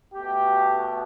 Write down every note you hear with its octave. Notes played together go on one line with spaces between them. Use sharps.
B2 A3 G4